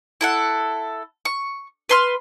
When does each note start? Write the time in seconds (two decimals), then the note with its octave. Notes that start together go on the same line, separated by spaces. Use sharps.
0.21 E4 A4 F#5
1.25 C#6
1.89 B4 C6 F6